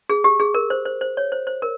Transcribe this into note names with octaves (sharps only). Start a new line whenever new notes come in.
G#4
G4
G#4
A#4
C5
C5
C5
C#5
C5
C5
A#4